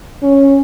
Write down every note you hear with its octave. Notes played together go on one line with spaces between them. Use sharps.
C#4